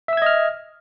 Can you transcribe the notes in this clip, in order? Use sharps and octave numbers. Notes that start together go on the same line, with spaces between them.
D#5 E5 E6 F6 G#6